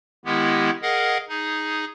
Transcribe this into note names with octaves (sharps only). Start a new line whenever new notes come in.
D#3 G#3 B3 E4 G4
G#4 A#4 D#5 F5 F#5
D#4 G#4